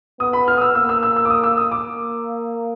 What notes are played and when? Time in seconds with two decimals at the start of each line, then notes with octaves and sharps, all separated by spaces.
0.20 B3 D#6
0.33 B5
0.48 F6
0.57 D#6
0.61 E6
0.75 A#3 E6
0.89 E6
1.03 E6
1.16 E6
1.25 D6
1.30 D#6
1.44 E6
1.57 D#6
1.71 D6
1.85 A#3